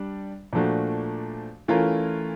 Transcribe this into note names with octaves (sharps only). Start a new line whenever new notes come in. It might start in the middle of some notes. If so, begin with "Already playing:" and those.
Already playing: G3 D4
A#2 F3 A3 D4 F#4
E3 A3 C#4 F4 A#4